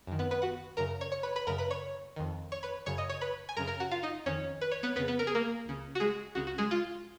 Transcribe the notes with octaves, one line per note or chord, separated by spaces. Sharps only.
F#2 D#3
B3 B4
B3 B4
F#4 F#5
F#2 C#3 A#4 A#5
C#5 C#6
C#5 C#6
B4 B5
B4 B5
F#2 C#3 A#4 A#5
B4 B5
C#5 C#6
F2 D#3
C#5 C#6
B4 B5
F#2 C#3 C#5 C#6
D#5 D#6
C#5 C#6
B4 B5
G#5
F#2 C#3 A#4 A#5
A#4 A#5
F#4 F#5
F4 F5
D#4 D#5
F2 D#3 C#4 C#5
B4
C#5
B3 B4
F2 C#3 B3 B4
B3 B4
A#4
G#4
A#3 A#4
C#2 C#3
F#4
G#3 G#4
C#2 C#3 F#4
F#4
G#3 G#4
F4